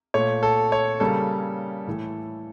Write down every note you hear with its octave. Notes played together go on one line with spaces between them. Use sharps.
A#2 A3 C#5
A4
C#5
C#3 G3 A#3 A4
A2 E3 A3